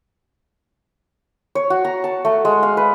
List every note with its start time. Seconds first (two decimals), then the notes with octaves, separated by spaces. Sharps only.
1.55 C#5
1.70 F#4
1.85 A#5
2.04 A5
2.25 A3
2.45 G#3
2.63 F5
2.77 B4